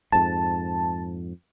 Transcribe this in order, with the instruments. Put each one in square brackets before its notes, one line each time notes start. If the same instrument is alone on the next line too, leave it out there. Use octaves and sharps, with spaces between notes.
[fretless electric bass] F2 G#2 [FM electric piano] A5